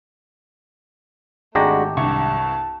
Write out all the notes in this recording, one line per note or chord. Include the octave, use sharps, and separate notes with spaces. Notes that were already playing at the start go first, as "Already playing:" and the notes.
G#1 G#3 A3 D4 F#4 G4 A#5
C2 G2 A5 C#6